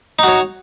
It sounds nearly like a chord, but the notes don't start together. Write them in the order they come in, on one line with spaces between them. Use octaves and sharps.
D#4 F#4 C#5